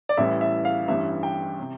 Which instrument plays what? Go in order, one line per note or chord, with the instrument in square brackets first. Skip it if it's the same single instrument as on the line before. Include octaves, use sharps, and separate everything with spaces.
[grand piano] D5
A1 A2 E3 G3 E5
E5
F5
A1 G2 E3 G3 E5
G5
C3